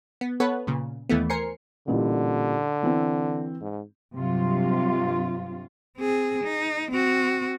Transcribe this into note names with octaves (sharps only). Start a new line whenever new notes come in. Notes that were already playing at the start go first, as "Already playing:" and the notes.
B3
B3 A4 B4 C#5 F#5
A#2 C#3
D#2 E3 A3 B3
A#4 C5 G#5 C7 C#7
A1 A#2 D3 G3
E3 C4
G#2
G2 C3 F#3 F4
C4 G#4
D#4
C4 F#4